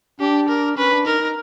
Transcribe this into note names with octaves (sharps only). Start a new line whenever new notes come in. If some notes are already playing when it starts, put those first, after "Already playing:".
D4 G4
A#4
C#4 B4
D4
D#4 A#4
D#4